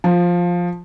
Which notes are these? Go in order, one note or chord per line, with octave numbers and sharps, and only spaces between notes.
F3